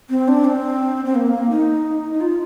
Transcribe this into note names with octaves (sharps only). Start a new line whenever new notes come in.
C4
D4
C4
C4
A#3
A#3
D#4
D#4
F4